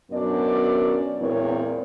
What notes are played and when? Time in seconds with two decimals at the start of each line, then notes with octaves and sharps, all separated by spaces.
0.12 F#2 B2 B3 D4 A#4 D5
1.19 E2 A#2 G#3 C4 A#4 C#5